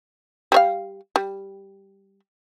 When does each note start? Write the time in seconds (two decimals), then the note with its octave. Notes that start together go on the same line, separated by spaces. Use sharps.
0.52 G3 C#5 F5
1.16 G3